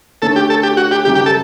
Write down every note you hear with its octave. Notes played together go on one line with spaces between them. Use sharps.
D3 A3 C#4 A4
G4
A4
G4
F#4
G4
F#2 C#3 G3 G4
G4
A4